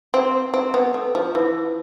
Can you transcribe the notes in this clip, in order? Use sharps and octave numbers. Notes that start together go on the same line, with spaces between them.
C4
C4
B3
A3
F3
E3